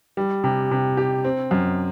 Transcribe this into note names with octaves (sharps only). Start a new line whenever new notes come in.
G3
C3
C3
G4
C4
F#2